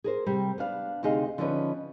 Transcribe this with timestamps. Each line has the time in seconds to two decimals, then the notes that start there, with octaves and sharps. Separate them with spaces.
0.04 G#4 A#4 C5
0.26 C3 G3
0.58 B3 D4 F5
1.03 D2 C3 D#4 G#4 F5
1.38 D3 F3 B3 C#4 D#4 B4